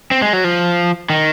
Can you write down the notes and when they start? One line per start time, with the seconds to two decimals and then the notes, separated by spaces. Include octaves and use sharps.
0.11 C4
0.22 G#3
0.33 F#3
0.44 F3
1.10 D#3